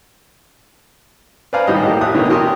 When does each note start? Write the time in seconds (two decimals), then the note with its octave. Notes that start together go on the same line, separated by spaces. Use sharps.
1.53 B4 C5 D5 F5 G#5 A#5
1.67 G#1 A2 E3 G3 G4 D#5
1.83 A#3 G4 A4
2.01 A1 E5 D#6 F#6
2.14 B2 D3 E3 A#3 G4 C#5
2.29 F#4 G4 A#4 G#5 C6 D#6